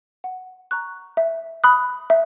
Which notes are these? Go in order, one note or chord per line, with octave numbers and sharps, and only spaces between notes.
F#5
A#5 C#6 F#6
E5
B5 D#6 F#6
E5